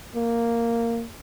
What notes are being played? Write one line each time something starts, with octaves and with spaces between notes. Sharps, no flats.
A#3